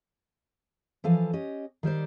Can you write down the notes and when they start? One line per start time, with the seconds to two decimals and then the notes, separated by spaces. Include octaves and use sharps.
1.04 E3 F3 A4 F5 G#5
1.33 C#4 G4 D#5
1.83 D#3 G3 C5 D5